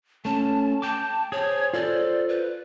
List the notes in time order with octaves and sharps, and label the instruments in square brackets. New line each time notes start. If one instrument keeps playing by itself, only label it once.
[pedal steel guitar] A3 C#4 [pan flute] A5
[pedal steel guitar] G5 D6 [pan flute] A5
[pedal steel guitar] G#4 C5 [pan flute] C#5
[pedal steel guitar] F4 A4 C5 [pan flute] D5
[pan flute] B4